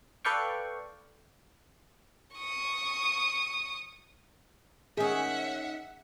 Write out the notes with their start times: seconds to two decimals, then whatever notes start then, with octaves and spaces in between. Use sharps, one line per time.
0.25 A4 B4 D5 F5 G5 C#6
2.36 C#6 D#6
4.97 D#3 C#4 G#4 E5 F#5